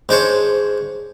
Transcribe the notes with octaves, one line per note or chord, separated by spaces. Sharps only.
G#2 D4 C5 C#5